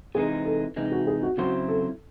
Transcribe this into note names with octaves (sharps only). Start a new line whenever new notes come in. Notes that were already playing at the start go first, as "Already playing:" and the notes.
C3 E3 G#3 D#4 G#4
A4
C3 E3 G#3 D#4
F#4
G#4
F#4
C#3 F#3 C4 E4 F#4 C5
A4